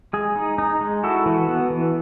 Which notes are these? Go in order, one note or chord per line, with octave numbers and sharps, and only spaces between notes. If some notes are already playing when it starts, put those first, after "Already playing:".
G#3 G#4
D#4
D#4
G#3
E4 F#4 A4
E3
B3
E3